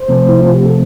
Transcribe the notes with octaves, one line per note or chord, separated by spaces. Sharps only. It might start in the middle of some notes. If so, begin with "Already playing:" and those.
Already playing: C5
C3 F3 A3 C4
E4
F4
G4
A4